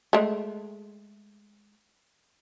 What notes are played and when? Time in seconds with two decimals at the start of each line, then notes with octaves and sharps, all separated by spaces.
0.13 G#3 A3